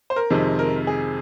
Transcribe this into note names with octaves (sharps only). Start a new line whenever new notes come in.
C5
A#4
F2 C3 D#3 G#3
A#4
G#4